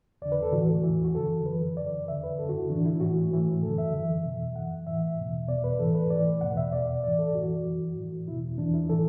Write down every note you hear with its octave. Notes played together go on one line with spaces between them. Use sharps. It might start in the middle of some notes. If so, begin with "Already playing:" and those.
E2 D3 D5
B4
A4
A2 E3 F#4
E2 E3
F#4
F#2 D3 A4
F#2 E3 B4
F#2 D3 D5
E2 D3 E5
B4
F#2 D3 A4
F#4
E4
A2 E3 D4
E4
A2 E3 F#4
A2 E3
F#2 D3 A4
E5
F#2 E3
E2 B2
F#2 E3 F#5
A2 E3 E5
E2 B2
E2 B2 D5
B4
A2 E3 A4
B4
A2 E3 D5
E2 B2 F#5
E5
E2 B2 D5
A2 E3 D5
A4
F#2 E3 F#4
F#2 E3
A2 E3
E2 B2 E4
E2 E3 D4
E4
A2 E3 A4